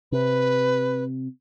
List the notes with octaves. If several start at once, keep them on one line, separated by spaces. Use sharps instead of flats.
C3 B4